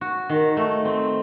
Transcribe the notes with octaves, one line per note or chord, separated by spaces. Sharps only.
F#4
D#3
A3
C4